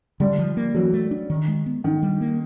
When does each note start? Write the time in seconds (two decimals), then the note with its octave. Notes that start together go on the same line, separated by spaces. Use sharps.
0.20 D3 G3
0.39 F3
0.57 A#3
0.74 E3 F#3
0.93 A3
1.11 D4
1.30 D#3
1.48 G#3
1.66 B3
1.84 D#3 D4
2.03 G3
2.21 A#3